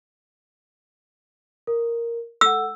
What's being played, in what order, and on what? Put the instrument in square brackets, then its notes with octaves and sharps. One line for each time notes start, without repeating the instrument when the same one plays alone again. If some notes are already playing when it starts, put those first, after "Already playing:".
[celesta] A#4
[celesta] A4 F#5 [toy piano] E6